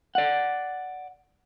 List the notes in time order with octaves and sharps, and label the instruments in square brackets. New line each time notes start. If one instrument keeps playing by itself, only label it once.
[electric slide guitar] D5 F#5